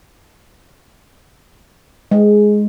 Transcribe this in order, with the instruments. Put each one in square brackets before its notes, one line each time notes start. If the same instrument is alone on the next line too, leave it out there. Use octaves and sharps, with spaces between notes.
[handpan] G#3